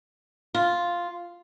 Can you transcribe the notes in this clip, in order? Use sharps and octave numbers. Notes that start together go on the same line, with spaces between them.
F4